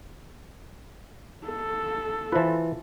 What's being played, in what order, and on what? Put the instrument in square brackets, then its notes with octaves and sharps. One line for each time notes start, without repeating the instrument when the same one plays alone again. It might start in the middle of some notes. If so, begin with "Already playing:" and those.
[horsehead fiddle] A4
[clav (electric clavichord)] E3 B4 [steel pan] F4 C5 A5